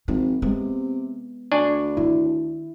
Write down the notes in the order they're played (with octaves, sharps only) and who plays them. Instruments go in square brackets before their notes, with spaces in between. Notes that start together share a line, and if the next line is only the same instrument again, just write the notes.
[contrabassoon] G#1 [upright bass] F3
[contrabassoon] C3 [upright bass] G#3 B3
[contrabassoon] D2 [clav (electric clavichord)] D4 G#5 [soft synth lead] C#6
[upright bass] D#3 [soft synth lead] E4